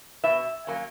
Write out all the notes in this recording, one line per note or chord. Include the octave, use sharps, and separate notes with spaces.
B2 E5
F#3 A#3 C#4